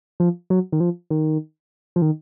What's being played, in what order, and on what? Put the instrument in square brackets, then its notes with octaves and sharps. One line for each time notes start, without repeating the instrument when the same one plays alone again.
[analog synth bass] F3
F#3
D#3
F3
D#3
F3
D#3